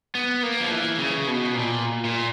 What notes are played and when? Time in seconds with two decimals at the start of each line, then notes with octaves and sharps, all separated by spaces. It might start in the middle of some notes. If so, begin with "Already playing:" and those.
0.15 B3
0.43 A#3
0.61 F3
0.71 E3
0.98 C#3
1.27 B2
1.55 A#2
2.05 A#2